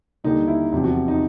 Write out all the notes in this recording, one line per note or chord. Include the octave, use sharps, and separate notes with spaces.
D#2 D3 G3 D#4
E4
E2 C3 F3
F#4
D#4